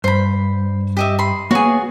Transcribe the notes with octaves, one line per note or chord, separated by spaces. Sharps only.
G2 C5 B5
G4 D#5 E5
B5 C6
A#3 B3 F#4 G#4 C#5